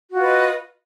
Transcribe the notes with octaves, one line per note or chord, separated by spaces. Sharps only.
F4 F#4 B4 D#5